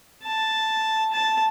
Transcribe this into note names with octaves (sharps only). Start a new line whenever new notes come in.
A5
A5